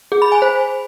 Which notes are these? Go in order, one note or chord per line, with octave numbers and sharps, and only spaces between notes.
G#4
B5
G#5
C5